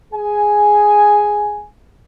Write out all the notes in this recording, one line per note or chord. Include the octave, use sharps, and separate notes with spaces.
G#4 G#5